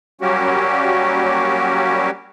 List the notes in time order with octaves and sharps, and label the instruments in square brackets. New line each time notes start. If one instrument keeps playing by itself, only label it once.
[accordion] F#3 G3 A#3 C#4 F#4 G4